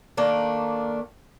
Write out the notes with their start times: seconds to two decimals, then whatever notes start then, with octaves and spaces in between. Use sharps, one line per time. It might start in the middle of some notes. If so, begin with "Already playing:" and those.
0.17 D#3 A3 A#3 D4